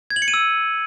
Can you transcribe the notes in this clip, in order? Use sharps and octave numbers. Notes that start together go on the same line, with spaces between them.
G#6
F#7
C#7
D#7
E6